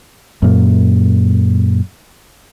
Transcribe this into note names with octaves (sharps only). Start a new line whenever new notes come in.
F#2 A#2